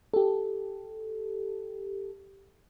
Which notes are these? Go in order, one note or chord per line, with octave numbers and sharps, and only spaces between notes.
G4 A4